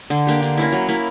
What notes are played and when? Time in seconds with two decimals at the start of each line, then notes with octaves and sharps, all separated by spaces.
0.10 D3
0.27 A#3 D4 G4
0.42 D3
0.58 A#3 C#4 E4
0.73 F#3
0.88 A#3 E4